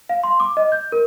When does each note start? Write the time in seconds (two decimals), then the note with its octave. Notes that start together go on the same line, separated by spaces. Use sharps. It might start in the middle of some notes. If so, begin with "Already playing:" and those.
0.09 F5
0.23 C6
0.40 D6
0.57 D#5
0.72 G6
0.92 A#4